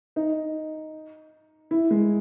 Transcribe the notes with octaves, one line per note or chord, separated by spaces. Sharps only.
D#4
E4
G#3